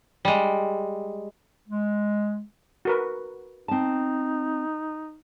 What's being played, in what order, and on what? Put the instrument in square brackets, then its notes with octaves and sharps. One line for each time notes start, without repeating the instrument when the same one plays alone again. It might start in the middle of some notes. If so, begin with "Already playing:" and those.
[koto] G3 G#3
[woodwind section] G#3
[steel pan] F#4 A#4 B4
[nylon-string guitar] C4 A5 [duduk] D#4